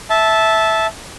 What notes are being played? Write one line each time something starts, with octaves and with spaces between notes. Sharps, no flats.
E5 A5